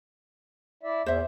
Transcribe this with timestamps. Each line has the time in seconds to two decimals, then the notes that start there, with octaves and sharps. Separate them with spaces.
0.83 E4 D5 E5
1.06 E2 A#2 C5 E5